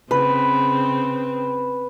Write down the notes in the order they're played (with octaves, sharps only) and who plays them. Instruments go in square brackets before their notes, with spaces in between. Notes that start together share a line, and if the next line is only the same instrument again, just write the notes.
[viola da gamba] C#3 C4 [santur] B4